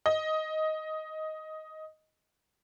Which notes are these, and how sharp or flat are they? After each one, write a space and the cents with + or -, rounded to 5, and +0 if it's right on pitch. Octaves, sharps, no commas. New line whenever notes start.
D#5 +10